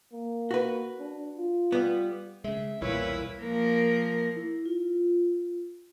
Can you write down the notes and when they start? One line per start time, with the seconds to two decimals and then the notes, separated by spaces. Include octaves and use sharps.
0.13 A#3
0.51 F#4 B4
0.99 D4
1.37 F4
1.72 G3 B3
2.44 C#3 G#3 E5
2.82 B1 E2 A#2 G3 E4 A#4 B4 C#5
3.42 F3 A#3 A#4
4.36 E4
4.66 F4